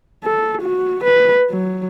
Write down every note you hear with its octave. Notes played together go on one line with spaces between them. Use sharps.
A4
F#4
B4
F#3